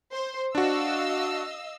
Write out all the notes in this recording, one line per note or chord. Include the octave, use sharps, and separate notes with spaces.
C5
D4 F#4 D#5 F5 E6